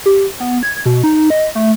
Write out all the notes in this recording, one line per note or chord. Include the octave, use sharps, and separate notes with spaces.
G4
B3
G#6
B2
D#4
D#5
A3